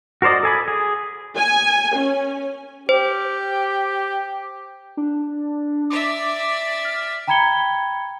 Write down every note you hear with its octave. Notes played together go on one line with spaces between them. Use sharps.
F#4 A#4 C5 D5 D#5
A4 G#5 B5
G#4
G#5
C#4
G4 C5
D4
D5 E5 D6
F6
G5 A#5 B5 G#6 C#7 G7